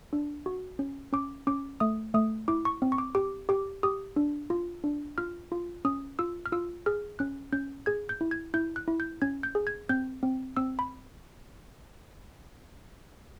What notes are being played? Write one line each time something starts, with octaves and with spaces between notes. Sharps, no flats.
D4
F#4
C#4
C#4 D6
C#4 D6
A3 D#6
A3 D#6
E4 D6
C#6
C4
C#6
D6
G4 D6
G4 D6
G4 D#6
D4
F4
D4
F4 F6
F4
C#4 D#6
F4 E6
F6
F4 E6
G#4 F6
C#4 F#6
C#4 G6
G#4 G#6
G6
E4
G#6
E4 G6
F#6
E4
G6
C#4 G#6
G6
G#4
G#6
C4 G6
C4
C4 E6
B5